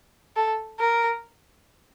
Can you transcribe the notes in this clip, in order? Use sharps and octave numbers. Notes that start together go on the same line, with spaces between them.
A4
A#4